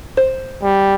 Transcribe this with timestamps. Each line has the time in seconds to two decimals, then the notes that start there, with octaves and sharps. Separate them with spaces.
0.17 C5
0.63 G3